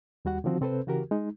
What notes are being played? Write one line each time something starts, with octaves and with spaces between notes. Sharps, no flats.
D#2 G3 F#4 F#5
D3 D#3 F3 C4 F#4
C3 C4 A4 B4 C5
C#3 E3 F#4 G4 A#4
G#3 D#4